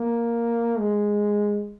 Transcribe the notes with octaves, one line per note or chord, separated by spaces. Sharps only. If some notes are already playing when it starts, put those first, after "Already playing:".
Already playing: A#3
G#3